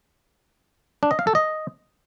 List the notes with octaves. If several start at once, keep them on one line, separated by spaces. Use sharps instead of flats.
D4
D#5
F5
A4
D#5